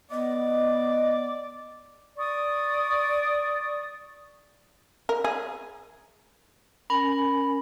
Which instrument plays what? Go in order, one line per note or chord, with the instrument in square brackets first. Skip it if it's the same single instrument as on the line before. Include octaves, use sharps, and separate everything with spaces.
[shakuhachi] B3 [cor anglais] D5 [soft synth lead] D#5
[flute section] D5 C#6 D#6
[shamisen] A#4
G#4
[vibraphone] C#4 A#4 G#5 [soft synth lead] B5